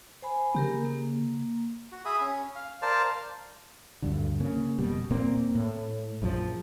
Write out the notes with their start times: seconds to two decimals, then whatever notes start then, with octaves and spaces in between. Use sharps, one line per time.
0.22 C5 G#5 B5
0.55 C#3 A#3 G4 A#4
0.85 A#3
1.92 F#4
2.05 G#4 E5 B5 D#6
2.21 C#4
2.55 F5
2.82 A#4 C5 D5 F5 A5 F6
4.02 D2 G2 D3
4.40 C#3 A#3
4.78 F1 B2 G3
5.10 D#1 A#2 A#3 C4
5.55 A2
6.22 A#1 F#2 E3 F3